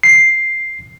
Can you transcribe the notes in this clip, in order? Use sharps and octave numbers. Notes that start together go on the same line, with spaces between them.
C7